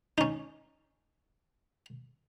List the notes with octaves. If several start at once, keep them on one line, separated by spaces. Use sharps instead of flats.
C#4 D#4